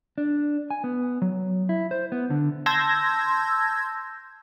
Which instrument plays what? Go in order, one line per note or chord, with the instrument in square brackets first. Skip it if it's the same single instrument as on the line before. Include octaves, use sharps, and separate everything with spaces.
[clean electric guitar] D4
G#5
B3
F#3
E4
C5
B3
D3
[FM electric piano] A5 C6 E6 G6 G#6 A#6